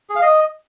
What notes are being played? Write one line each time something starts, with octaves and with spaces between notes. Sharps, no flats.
G#4
F5
D#5